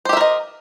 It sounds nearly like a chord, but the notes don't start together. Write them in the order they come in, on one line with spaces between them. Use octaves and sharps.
C5 G4 E5 A#4 D#5